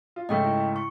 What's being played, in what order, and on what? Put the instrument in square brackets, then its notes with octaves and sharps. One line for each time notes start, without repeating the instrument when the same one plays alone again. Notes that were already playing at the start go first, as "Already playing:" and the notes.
[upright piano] F4
[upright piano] G#2 C#3 A3 [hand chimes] D#5 G5 C#6
[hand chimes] E4
C#6